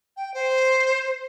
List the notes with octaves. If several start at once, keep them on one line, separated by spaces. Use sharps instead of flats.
G5
C5